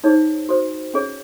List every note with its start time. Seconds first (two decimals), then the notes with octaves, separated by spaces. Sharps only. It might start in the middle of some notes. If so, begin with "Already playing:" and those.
0.04 D#4 G#4 C5 C#5
0.49 F#4 C5
0.94 C#4 G#4 C#5